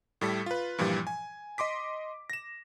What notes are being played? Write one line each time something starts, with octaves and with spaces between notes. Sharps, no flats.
A2 G3 A4 B6
F4 B4
G2 A#2 E3 F3 G3
G#5
D#5 C6 D6 B6
A#6 E7